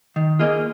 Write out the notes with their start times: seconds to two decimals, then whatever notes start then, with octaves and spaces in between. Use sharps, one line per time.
0.16 D#3
0.39 A#3 F4 G#4 D#5